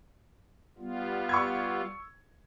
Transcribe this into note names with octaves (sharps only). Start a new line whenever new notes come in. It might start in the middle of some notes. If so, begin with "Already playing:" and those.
G3 B3 F4
C#6 E6 G#6